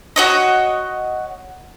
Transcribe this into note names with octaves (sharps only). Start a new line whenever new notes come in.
F#4 C#5 D#5